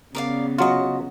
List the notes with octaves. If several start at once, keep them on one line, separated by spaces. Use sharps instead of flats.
C#3 B3 A#4 D5 F5
F#3 F4 F#4 D#5